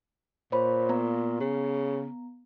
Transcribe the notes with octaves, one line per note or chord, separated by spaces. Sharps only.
A#2 C5 C#5 B5
B3 A#5
C#3